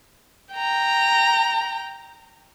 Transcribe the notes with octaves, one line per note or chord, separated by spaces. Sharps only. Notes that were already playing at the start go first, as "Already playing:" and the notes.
G5 A#5